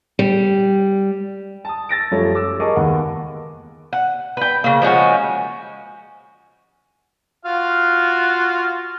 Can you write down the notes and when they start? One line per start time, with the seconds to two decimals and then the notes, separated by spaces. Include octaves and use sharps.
0.19 G3
1.65 A5 D#6
1.89 E6 A6 A#6 D7
2.11 F#2 F3 G3 A3 C#5
2.35 D6 E6
2.60 G#4 A#4 D#5 A5 C#6 D6
2.76 D#2 B3 F#5
3.93 F#5
4.37 B4 G5
4.64 C#3 A#3
4.82 F3 G#3 C#4 F#4
7.45 F4 F#4 F5